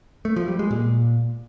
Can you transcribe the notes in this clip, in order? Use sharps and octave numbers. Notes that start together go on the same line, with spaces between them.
A3
F3
G3
G#3
A#2